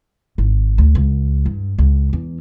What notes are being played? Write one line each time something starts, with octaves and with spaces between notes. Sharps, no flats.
G#1
D2
C#2
G2
C#2
E2